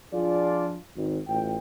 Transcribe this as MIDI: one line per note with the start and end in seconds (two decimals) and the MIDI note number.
0.11 0.75 53
0.11 0.75 62
0.11 0.75 65
0.11 0.75 68
0.11 0.75 74
0.96 1.18 32
1.27 1.56 33
1.27 1.56 65
1.27 1.56 79